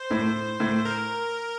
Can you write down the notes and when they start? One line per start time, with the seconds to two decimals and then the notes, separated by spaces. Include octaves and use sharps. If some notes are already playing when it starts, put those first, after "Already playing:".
Already playing: C5
0.11 A2
0.60 A2
0.85 A#4